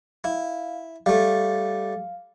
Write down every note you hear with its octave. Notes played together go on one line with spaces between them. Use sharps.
E4 F5
G3 A3 F5